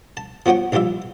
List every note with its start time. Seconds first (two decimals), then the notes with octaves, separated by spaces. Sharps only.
0.17 A5
0.46 F3 B3 F#4 C#5 G5
0.72 A#1 E3 G3 F4 E5